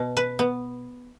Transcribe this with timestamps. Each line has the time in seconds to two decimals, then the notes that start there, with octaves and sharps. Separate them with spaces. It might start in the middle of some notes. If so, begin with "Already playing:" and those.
Already playing: B2
0.17 B4
0.39 B3